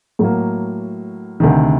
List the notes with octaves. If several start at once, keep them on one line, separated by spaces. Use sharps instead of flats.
A2 F#3 A#3
D2 C3 D#3